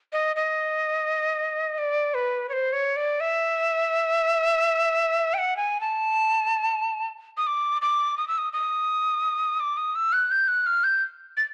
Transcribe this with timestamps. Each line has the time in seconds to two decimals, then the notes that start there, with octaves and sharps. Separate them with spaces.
0.13 D#5
0.36 D#5
1.78 D5
2.14 B4
2.49 C#5
2.53 C5
2.73 C#5
2.96 D5
3.20 E5
5.34 G5
5.38 F#5
5.57 G#5
5.81 A5
7.37 D#6
7.47 D6
7.82 D6
8.17 D#6
8.28 E6
8.38 D#6
8.53 D#6
9.60 D6
9.77 D#6
9.95 E6
10.13 F#6
10.31 G6
10.48 F#6
10.66 F6
10.84 G6
11.37 A6